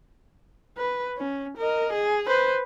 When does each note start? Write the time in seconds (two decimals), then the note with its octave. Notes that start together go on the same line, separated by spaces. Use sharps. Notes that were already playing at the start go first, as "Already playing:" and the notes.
0.78 B4
1.17 C#4
1.57 A#4 D#5
1.93 G#4
2.28 B4 C5